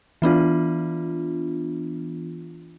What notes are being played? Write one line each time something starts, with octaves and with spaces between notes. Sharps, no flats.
E3 B3 D4 F4